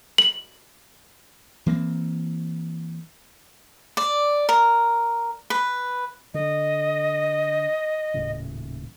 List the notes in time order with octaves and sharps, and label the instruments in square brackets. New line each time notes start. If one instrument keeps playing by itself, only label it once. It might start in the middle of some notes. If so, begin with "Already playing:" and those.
[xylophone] F#7
[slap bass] E3 A#3 C4
[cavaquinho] D5
A#4
B4
[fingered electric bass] D3 [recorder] D#5
[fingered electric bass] D#1 A2 C#3